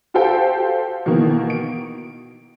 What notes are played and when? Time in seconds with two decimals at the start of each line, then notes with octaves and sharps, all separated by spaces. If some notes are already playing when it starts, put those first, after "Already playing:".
0.14 F#4 G4 A4 C5 F5 G5
1.06 B2 D#3 E3 A#3
1.50 D7